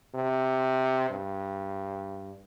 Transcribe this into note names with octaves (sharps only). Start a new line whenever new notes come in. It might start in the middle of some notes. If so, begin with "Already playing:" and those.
C3
G2